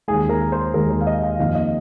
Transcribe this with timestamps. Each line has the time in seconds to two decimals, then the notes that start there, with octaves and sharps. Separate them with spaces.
0.08 D#2 D#3 G#3 G#4
0.29 A#4
0.52 C5
0.74 D#2 D#3 G#3 A#4
0.90 C5
1.01 F5
1.07 D#5
1.23 F5
1.39 F2 D#3 A#3 F5
1.55 D#5